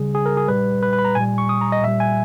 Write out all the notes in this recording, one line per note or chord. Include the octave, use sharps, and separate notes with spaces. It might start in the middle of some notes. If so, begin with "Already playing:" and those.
Already playing: C#3 G3 G#4
G#4
A#4
G#4
A#2 G3 B4
B4
B4
B5
A#5
A#2 G3 G#5
C#6
D#6
A#5
D#5
A#2 G3 E5
G#5